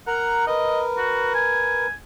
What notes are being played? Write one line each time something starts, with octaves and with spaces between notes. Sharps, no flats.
A#4 F#5 A#5
A#4 B4 D#5
F#4
G#5